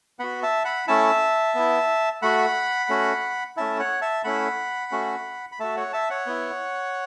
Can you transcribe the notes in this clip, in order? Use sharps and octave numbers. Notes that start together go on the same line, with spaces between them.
B3 F#4 F#5 B5
E5 A5
F#5 B5
A3 C#4 E4 E5 A5
B3 E4
A3 F#4 F#5 B5
A3 C#4 F#4
A3 C#4 E4 E5 A5
C#5 F#5
E5 A5
A3 C#4 E4 F#5 B5
A3 C#4 F#4
B5
A3 F#4 E5 A5
C#5 F#5
E5 A5
C#5 F#5
B3 E4